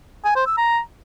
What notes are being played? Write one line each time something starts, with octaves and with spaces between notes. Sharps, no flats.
G#5
C5
E6
A#5